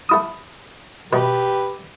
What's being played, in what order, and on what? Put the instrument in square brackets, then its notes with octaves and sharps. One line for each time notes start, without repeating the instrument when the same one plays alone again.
[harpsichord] A3 E4 D#6
[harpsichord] B2 A3 [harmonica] G4 B4